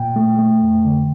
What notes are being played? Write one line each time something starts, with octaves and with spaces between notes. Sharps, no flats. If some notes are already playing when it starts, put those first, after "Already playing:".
Already playing: A#2 G5
A3
A3
F2
D3